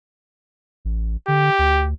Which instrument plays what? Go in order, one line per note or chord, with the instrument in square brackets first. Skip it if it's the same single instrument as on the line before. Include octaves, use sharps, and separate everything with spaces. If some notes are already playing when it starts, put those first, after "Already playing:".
[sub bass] A1
[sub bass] D3 [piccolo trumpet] G4
[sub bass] D2